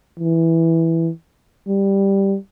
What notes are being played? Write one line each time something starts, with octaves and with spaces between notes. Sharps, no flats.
E3
G3